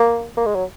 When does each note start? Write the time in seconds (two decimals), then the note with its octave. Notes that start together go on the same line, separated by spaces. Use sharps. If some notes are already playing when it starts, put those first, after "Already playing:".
Already playing: A#3
0.37 A#3
0.46 G#3
0.55 F#3